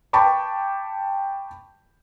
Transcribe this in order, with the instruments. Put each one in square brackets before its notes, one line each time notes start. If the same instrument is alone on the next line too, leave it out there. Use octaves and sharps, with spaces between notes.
[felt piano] G5 A5 B5 C#6 D6